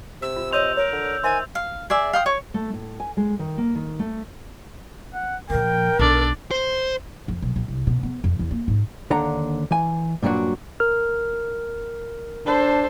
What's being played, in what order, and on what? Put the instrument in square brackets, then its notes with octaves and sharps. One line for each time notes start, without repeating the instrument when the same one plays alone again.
[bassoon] C3 [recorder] E6
[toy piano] F4
[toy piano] C#5 C6 [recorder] D#5 [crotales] E6 G6 F7
[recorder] A#4 [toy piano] C#5
[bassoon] D3
[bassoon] D#3 [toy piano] C5 E5 C6 [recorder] G#5
[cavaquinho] F5
G#4 D5 E5
F5 G5 D#6
C#5
[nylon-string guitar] A3
A2
G#5
G#3
D#3
A#3
D#3
A3
[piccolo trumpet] F#5
[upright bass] A#2 F3 [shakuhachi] A#4 [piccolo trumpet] G5
[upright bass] B1 [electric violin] D4 D5 [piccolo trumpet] A4
[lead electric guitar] C5
[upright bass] F2
B1
A#1
C2
B2
B3
F2
E2
A#3
G#2
[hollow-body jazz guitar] D#2 D3 D4 F#5 A#5
E3 G#5
G2 A#2 F#3 D4 F#4
[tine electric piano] A#4 F6
[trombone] D4 [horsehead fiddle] A4 C5